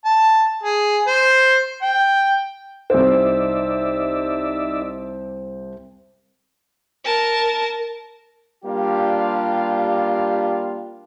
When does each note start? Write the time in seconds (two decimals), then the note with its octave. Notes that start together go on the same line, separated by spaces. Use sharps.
0.05 A5
0.63 G#4
1.07 C5
1.82 G5
2.90 C2 D#4 C5 D5 E5
7.05 A#4 A5
8.65 G3 A#3 D4 F4 G4